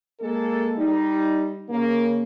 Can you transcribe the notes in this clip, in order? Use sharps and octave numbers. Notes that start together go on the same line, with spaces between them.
G#3 A#3 A4
G3 D#4
C#3 A#3